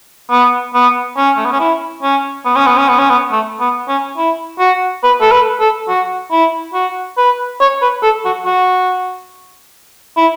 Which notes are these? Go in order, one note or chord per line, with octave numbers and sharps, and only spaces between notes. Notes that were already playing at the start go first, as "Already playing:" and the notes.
B3
B3
C#4
A3
B3
C#4
E4
C#4
B3
C#4
B3
C#4
B3
C#4
B3
A3
B3
C#4
E4
F#4
B4
A4
B4
A4
F#4
E4
F#4
B4
C#5
B4
A4
F#4
F#4
E4